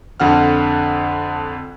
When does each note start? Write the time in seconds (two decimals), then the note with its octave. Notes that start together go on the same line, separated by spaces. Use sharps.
0.20 F2 D3 F#5 F6